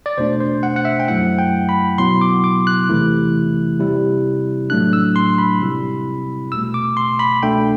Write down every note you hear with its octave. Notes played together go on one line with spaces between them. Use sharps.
D5
E2 B2 A3 D4 C5
C5
F#5
F#5
E5
G5
F#2 F#3 A3 E4 F#5
G5
B5
B2 F#3 B3 E4 C6
D6
D6
F#6
E2 C3 E3 A3 E4
C3 G3 C4 E4
A2 F#3 A3 D4 F#6
E6
C6
B5
C3 G3 C4 E4
E2 B2 A3 E6
D6
C6
B5
C2 B2 A3 D4 G5